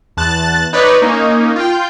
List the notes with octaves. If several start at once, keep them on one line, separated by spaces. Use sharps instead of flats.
E2 A5 F#6 A6
D#4 B4 C#5 D5
A#3 C#4 D#4
F4 G5